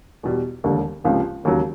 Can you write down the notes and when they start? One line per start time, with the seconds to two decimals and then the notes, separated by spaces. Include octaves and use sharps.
0.23 E2 B2 G3
0.64 E1 D#2 D3 G3
1.04 C#2 C3 F3 A#3 C#4
1.44 E1 D#2 C#3 F#3